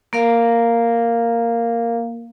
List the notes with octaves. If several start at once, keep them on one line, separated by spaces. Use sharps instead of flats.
A#3 A#4 F5